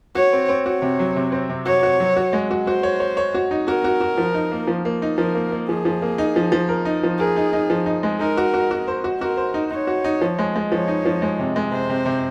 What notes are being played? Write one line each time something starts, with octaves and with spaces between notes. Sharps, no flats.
F#4 C#5
C4
C4
F#4 C#5
C3
F#3
C3
C4
C3
F#4 C#5
F#4
F#3
F#4
G#3
F#4
F#4 C5
C#5
C#5
C#5
F#4
D#4
F#4 A#4
F#4
F#4
F3
D#4
A#3
F3
A#3
D#4
F3 A#4
A#3
A#3
F3 G#4
F3
A#3
D#4
F3
F3
A#4
D#4
F3
G#4 A#4
D#4
D#4
F3
D#4
G#3
D#4 A#4
F#4
F#4
F#4
C5
F#4
F#4 A#4
C5
D#4
D#4 C#5
F#4
D#4
F3
G#3
G#3
F3 C#5
D#4
F3
G#3
C3
G#3
C3 C5
C3
C3